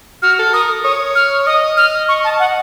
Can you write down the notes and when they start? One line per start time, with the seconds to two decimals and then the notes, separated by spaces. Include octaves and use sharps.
0.22 F#4 F6
0.39 A4
0.53 A#4 D#6
0.84 C#5 D#6
1.15 F6
1.46 D#5 D#6
1.77 F6
2.08 C#6
2.24 A5
2.39 F#5